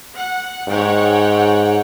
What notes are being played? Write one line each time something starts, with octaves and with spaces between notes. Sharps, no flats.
F#5
G#2 C#5 F#5 G5